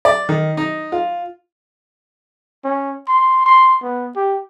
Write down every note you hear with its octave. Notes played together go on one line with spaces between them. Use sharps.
D5
D#3
D#4
F4
C#4
C6
C6
B3
G4